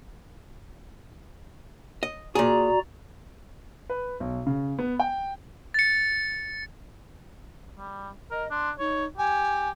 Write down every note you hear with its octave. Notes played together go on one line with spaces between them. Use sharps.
D#5
A#2 F#4 G#4 D5 A#5
B4
B1
C#3
B3
G5
A6 C#7
G3
A#4 D#5
D4 C6
D#4 C#5
G4 G#5